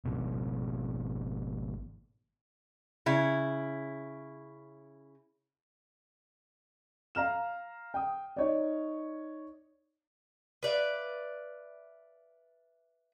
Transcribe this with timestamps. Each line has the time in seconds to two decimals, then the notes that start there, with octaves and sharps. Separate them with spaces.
0.05 G#1 B2
3.06 C#3 E4
7.15 F5 A#5 F6 E7
7.94 G5 D#6
8.36 D#4 C#5 D5
10.63 B4 D5 E5 F5